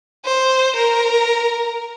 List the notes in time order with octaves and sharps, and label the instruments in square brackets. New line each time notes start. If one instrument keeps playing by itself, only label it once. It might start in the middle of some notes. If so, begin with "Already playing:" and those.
[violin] C5
A#4